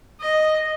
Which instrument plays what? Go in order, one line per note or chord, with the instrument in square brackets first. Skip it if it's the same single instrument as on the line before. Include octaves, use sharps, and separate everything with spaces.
[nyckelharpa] D#5